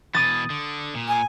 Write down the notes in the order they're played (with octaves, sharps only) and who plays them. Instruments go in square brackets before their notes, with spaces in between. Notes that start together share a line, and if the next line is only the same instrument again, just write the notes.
[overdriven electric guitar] B2 E3 [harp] D#6 A6
[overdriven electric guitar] D3
A#2
[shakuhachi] G#5